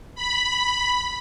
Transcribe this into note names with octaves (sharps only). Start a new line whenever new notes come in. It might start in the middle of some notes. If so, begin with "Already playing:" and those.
B5